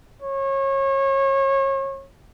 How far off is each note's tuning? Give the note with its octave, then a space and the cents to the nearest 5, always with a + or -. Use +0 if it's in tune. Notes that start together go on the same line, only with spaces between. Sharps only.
C#5 -30